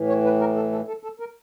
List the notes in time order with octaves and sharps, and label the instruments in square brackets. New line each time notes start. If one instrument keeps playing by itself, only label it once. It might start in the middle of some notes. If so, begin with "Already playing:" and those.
Already playing: [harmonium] A2 E3
C#5
B4
A#4
A4
A4
A4
A4
A#4